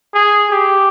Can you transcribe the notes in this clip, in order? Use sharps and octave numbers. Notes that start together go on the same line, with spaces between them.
G#4
G4